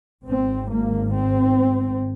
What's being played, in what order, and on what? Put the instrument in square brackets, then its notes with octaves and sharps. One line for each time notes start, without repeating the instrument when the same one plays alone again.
[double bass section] G#1 G#2 C4
A#3
C4